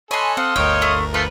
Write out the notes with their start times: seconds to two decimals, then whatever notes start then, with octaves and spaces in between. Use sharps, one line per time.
0.11 A4 C#5 D#5 G#5 B5 C6 F#6
0.37 C4 F5 F#5 C6 D#6
0.56 G1 D2 A#4 C#5 D#5 G5
0.82 A3
1.14 F3 A3 F4 B4